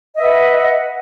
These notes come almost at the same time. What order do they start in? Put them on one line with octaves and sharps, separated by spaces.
D#5 E5 B4 F#5